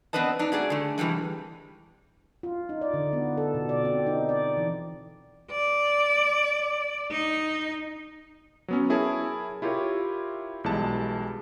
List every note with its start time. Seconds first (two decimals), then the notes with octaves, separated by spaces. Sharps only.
0.13 B3 C4 D4 B4 D#5 A5
0.39 D4 D#4
0.52 A3 F#4 G#4 D5
0.70 D3 A3
0.98 C3 E3 F3 G3 G#3
2.43 F4
2.69 D#4
2.81 D5
2.94 D3
3.13 B3
3.38 A4
3.54 B2
3.69 D5
3.85 C4
4.07 D#4
4.29 D5
4.57 E3
5.52 D5
7.12 D#4
8.68 F#3 B3 C#4
8.90 E4 G#4 A#4 C#5 A5
9.62 E4 F4 G4 A#4 C#5
10.64 B1 E3 G3 G#3 A5